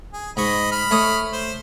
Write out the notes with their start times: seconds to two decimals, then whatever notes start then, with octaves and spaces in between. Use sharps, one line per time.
0.13 G#4
0.37 G#2 D#5 B5 C#6
0.72 B5 F6
0.91 A3 C#5 D#6
1.33 C5